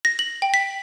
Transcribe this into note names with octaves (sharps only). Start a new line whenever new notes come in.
A#6
F#7
G5
B6